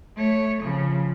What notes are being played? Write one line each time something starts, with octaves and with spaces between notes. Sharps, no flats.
A3 C#5
C#3 F3